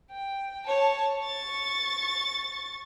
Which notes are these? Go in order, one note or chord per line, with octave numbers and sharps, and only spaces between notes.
G5
C#5 A5
C#6 A6